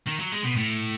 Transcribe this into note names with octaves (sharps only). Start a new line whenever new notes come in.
D#3
F#3
G#3
B2
A2